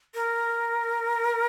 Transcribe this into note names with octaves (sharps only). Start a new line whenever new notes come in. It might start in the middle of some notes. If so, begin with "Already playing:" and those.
A#4